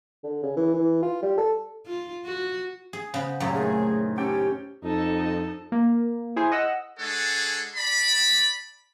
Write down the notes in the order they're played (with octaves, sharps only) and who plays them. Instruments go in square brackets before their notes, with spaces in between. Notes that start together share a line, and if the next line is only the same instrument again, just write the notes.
[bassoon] D3
C#3
E3
E3
F4
G3
A4
[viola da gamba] F4
F#4
[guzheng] G#4
[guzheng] C#3 B3 [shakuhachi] C5
[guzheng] F#2 A#2 [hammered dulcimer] C#3 A3 C4
[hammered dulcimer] A2 D#3 [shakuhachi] G#4
[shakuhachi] C#4 [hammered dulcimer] G4 A4 G5
[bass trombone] F2 [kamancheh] D#4 A4
[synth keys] A#3
E4 G#4 C5
D#5 F#5 E6
[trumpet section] G#3 D4 G#4 A4 C#5 F#5
D5 A5 B5